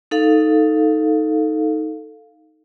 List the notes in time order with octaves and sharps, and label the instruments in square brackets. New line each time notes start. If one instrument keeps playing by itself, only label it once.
[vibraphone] D#4 A4 F5